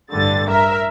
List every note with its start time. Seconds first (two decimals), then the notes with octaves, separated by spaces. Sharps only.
0.12 A1 G2 D3 A6
0.50 A#4 E5